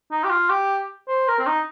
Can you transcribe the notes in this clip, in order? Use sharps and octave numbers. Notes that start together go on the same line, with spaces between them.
D#4
G4
F4
G4
C5
A#4
C4
D#4